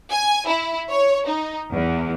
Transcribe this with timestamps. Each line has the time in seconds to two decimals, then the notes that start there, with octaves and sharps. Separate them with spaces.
0.11 G#5
0.46 E4
0.89 C#5
1.26 D#4
1.72 E2